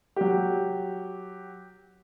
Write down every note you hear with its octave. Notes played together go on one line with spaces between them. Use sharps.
F#3 G4